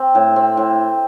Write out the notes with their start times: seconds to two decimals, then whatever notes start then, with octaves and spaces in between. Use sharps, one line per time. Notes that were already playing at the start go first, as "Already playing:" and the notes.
Already playing: C4
0.15 A2
0.36 C4
0.57 A2